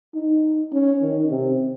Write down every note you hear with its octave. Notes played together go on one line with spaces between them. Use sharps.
D#4
C#4
D#3
C3